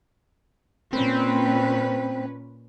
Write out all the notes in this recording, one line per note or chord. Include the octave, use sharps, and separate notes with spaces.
A#2 C4 C#4 B4